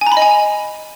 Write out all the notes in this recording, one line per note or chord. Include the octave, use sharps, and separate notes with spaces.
G#5
A#5
B5
D#5
G#5